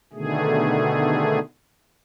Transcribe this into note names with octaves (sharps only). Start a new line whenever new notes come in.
B2 D3 D#3 A3 G#4